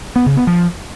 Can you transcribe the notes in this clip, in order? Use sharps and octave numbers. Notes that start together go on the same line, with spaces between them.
B3
C#3
B3
F3